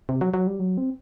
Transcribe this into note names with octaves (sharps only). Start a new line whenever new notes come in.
C3
F#3
F#3
G3
F#3
C4